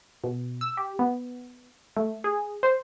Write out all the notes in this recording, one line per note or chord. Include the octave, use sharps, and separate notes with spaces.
B2
E6
G4
B3
A3
G#4
C5